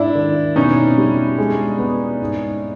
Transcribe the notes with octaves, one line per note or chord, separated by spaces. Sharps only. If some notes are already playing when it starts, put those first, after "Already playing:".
Already playing: G#2 D4 E4
D#3
B2 C#4 D#4
G3
G#3
B3
G#2